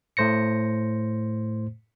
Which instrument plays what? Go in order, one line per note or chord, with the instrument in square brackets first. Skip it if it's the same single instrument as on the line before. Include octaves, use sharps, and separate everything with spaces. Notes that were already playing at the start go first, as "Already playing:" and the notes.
[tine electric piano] A2 A3 C5 A#6 C#7